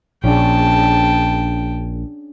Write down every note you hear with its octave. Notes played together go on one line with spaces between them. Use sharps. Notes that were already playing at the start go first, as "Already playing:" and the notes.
A#1 C#4 D4 G#4 G5 A5